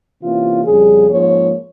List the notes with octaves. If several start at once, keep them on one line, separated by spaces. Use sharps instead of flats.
C3 E3 A#3 C#4 F4
F2 C#3 G3 C#4 G#4
G#2 F3 A#3 C#4 C#5